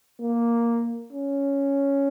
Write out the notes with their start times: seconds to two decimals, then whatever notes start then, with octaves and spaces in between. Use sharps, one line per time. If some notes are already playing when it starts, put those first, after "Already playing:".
0.20 A#3
1.12 C#4